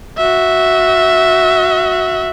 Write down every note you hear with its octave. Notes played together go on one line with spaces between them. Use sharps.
F#4 E5